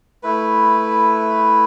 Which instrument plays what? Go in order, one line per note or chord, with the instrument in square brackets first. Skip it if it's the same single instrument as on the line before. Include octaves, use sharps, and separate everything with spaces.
[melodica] A3 E4 B4